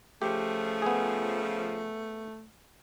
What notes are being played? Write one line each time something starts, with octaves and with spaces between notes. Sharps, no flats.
C#3 F3 A3 G4
B3 G#4